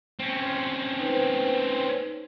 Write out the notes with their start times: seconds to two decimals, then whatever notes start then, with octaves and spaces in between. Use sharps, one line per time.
0.19 C4 C#4
1.00 D#4 B4 C5